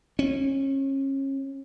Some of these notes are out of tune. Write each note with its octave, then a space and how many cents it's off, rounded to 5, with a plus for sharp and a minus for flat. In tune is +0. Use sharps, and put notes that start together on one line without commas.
C#4 -30